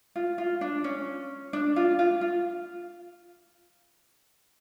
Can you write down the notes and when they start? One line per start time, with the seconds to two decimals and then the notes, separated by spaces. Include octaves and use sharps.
0.16 F4
0.38 F4
0.61 D4
0.84 C#4
1.53 D4
1.76 F4
1.99 F4
2.21 F4